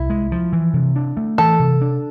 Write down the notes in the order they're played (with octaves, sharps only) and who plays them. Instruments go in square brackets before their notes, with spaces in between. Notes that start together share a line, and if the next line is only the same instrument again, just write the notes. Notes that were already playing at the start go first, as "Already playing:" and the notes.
Already playing: [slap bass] C2 [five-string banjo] E4
[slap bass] G#3
F3
E3
C3
D4
A3
[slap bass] E3 [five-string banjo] A4
[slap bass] C3
D4